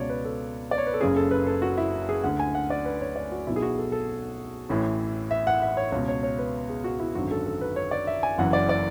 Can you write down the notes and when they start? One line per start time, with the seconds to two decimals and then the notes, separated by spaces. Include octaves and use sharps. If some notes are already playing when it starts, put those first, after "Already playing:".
Already playing: C#2 B2 C#5 D5
0.10 B4
0.25 A4
0.71 D5
0.78 C#5
0.87 B4
0.94 A4
1.01 F#1 F#2 C#3 G#4
1.16 A4
1.31 B4
1.47 A4
1.62 F#4
1.78 E4
2.09 G#4
2.24 D2 D3 F#5
2.40 G#5
2.55 F#5
2.70 D5
2.85 B4
3.01 C#5
3.16 D5
3.32 F#4
3.47 B1 B2 E4
3.56 G#4
3.62 F#4
3.78 A4
3.92 A4
4.69 A1 A2 E3
5.31 E5
5.47 F#5
5.62 E5
5.77 C#5
5.92 C#2 B2 C#5
6.08 C#5
6.23 C#5
6.39 B4
6.69 G#4
6.84 F#4
7.00 E4
7.15 G#1 F#2 D3 F#4
7.31 A4
7.46 A4
7.61 B4
7.76 C#5
7.91 D5
8.07 E5
8.23 G#5
8.38 F#1 F#2 E3 F#5
8.53 D5
8.69 D5